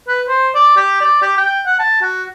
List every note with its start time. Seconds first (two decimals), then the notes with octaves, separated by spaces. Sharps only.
0.08 B4
0.28 C5
0.55 D5
0.76 G4
1.01 D5
1.22 G4
1.37 G5
1.66 F#5
1.79 A5
2.02 F#4